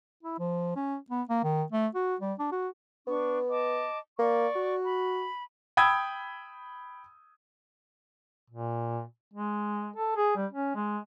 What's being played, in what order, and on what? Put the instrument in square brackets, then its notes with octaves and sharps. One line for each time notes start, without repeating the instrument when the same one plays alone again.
[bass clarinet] E4
F3
C#4
B3
A#3
D#3
A3
F#4
G3
D4
F#4
[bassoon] B3 [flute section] D4 C#6
[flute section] D#5 A5 D6
[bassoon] A#3 [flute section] D5 C#6
[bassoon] F#4
[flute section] B5
[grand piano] G5 B5 D#6 E6 G#6
[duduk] A#2
G#3
A4
G#4
G3
C#4
G#3